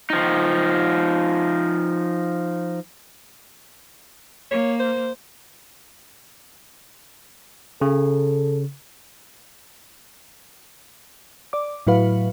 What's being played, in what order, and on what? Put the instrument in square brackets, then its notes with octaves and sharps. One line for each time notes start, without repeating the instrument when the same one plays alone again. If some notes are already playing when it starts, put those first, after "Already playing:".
[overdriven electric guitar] F3 D#4
[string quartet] A#3 [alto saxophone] C#5
[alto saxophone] C5
[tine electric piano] C#3 [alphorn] A4
[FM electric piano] D5 D6
A2 F#3 E4 F#4 B4 F5